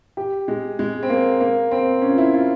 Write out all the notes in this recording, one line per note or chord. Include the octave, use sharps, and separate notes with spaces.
G4
G#3
G#3
C4
A#3
A#3
C4
C#4
F4
E4
F4